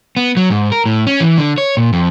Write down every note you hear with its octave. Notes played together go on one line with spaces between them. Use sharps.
B3
F#3
G#2
A#4
A2
C#4
E3
D3
C#5
A#2
F2